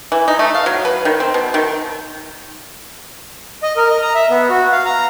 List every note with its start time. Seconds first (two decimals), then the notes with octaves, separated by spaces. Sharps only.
0.12 E3
0.28 D#4
0.39 A3
0.55 F5
0.66 F#3
0.85 B4
1.05 D#3
1.20 C4
1.34 B2
1.54 D#3
3.63 D#5
3.77 A#4
3.90 D#5
4.02 A#5
4.14 E5
4.30 B3
4.49 F#4
4.72 F5
4.86 A#5